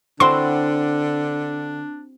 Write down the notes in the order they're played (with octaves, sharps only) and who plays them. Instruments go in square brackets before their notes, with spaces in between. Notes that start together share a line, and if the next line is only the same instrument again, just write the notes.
[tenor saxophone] D3 [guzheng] C4 E4 F#4 [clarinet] D4 [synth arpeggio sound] C6